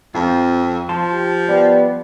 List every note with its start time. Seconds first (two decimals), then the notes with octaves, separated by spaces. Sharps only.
0.15 F2 C4 F4
0.89 F3 A5 C6
1.11 G4
1.48 G3 B3